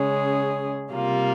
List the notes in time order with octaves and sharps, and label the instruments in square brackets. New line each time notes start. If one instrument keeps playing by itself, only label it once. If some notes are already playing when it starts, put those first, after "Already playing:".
Already playing: [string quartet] C#3 G#3 C#4 G#4
C3 G3 A#3 F4